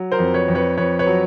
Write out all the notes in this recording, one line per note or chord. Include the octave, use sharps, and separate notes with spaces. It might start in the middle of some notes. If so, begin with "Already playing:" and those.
Already playing: F#3
A#4 C5
F2
B4 C#5
F2
B4 C#5
F2 B4 C#5
B4 C#5
F#3